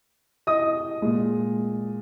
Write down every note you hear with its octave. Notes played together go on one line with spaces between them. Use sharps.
D#5 D#6
A#2 G#3